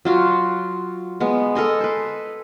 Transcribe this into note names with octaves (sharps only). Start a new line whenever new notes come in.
F#3 F4 F#4
G#3 B3
A4 A#4 D#5 G#5
B4 C5